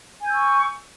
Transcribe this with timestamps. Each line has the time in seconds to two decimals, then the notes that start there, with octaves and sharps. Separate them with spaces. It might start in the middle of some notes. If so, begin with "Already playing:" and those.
0.21 G#5
0.25 G6
0.29 E6
0.33 C#6